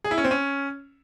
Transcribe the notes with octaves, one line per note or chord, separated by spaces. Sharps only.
G#4
E4
C#4
C4
C#4